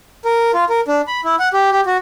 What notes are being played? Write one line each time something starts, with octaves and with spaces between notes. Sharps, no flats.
A#4
F4
A#4
D4
B5
E4
F#5
G4
G4
F#4